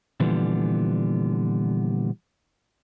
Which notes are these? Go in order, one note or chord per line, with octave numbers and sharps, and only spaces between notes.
A#2 D3 E3 F3 G3 B3